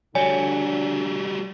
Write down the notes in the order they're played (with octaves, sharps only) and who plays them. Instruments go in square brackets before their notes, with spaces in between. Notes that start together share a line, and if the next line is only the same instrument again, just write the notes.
[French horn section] D3 D4 [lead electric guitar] G3 F#4 [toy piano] C#5 [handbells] G#5